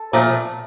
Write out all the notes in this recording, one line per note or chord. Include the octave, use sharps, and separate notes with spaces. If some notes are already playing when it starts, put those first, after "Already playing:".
Already playing: A4
A#2 F3 A3